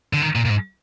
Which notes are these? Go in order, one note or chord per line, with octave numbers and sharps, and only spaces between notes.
D3
D#3
A#2
A#2
G#2